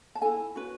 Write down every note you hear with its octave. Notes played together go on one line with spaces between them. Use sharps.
A5
E4 A4 G#5
C#4 F#4 B4